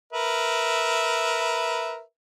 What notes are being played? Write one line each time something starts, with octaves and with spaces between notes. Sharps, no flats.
A#4 B4 E5